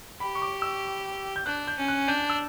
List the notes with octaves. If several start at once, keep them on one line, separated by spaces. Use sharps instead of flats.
G4 B5
C#6
D6
E6
G6
D4 F#6
G6
C#4
F#6
D4 G6
E6